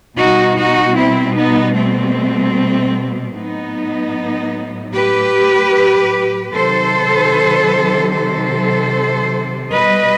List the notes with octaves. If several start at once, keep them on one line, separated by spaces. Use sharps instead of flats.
B2 G3 D#4 F#4
D#4 F#4
C4 E4
B3 D#4
A3 C4
A2 F#3 B3 D#4
G4 B4
C3 D#3 F#3 A4 C5
A4 C5
B2 G3 B4 D#5